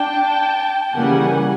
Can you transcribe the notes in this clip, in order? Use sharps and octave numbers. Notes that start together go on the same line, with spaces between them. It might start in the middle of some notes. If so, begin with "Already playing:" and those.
Already playing: D4 G5 A5
C#3 E3 G3 A#3 F#5 G#5